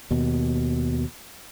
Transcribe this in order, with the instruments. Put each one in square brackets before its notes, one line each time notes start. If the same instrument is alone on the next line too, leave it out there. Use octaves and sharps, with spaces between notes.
[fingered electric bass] D#2 B2